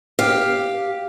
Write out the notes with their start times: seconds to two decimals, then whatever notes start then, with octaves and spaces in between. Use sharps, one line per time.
0.19 G4 F5